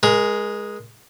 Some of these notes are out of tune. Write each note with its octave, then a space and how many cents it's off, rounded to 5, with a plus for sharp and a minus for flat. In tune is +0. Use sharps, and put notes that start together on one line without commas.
G#3 +0 A#4 +30